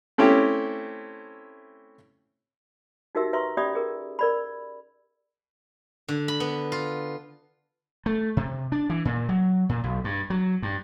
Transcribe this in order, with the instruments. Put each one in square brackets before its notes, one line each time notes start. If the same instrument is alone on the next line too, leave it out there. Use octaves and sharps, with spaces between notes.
[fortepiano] A3 C4 C#4 E4 G4
[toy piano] D#4 F#4 G4 A#4 E5 E6
B4 E5 A#5 C6 C#6
C#4 G4 D5 E5 B5 D#6
G#4 A#4
A#4 D5 B5
[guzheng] D3
B5
B3
F4
[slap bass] A3
C3
D4
E3
A#2
F#3
A#2
B1
G2
F#3
G2